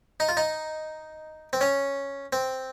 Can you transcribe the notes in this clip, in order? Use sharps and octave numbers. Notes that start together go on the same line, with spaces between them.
D#4
F4
D#4
C4
C#4
C4